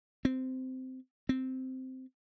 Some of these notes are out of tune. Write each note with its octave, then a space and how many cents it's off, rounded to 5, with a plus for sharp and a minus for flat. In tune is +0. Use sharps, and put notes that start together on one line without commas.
C4 -15
C4 -10